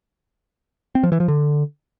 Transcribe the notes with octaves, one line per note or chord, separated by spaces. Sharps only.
C4
F3
E3
F3
D3